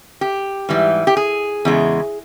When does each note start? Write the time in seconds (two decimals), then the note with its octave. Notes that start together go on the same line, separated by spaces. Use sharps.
0.21 G4
0.69 G#2 E3 G3
1.07 G4
1.17 G#4
1.65 E2 C#3 G#3